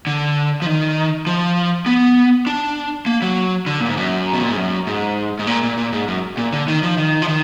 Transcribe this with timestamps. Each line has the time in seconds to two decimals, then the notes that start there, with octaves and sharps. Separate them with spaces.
0.07 D3
0.62 F3
0.66 D#3
1.27 F3
1.86 B3
2.47 D4
3.06 A#3
3.22 F#3
3.67 D3
3.80 A#2
3.88 G#2
3.97 F#2
4.33 B2
4.42 A#2
4.50 G#2
4.57 F#2
4.87 G#2
5.39 G#2
5.47 A#2
5.63 A#2
5.78 A#2
5.93 G#2
6.08 F#2
6.37 A#2
6.53 D3
6.68 D#3
6.83 F3
6.97 D#3
7.22 F3
7.28 D#3